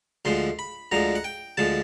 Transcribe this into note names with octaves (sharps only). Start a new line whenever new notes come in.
D2 D3 F3 G#3 C6
B5
D2 D3 F3 G#3 A#5
F#5
G5
D2 D3 F3 G#3 A5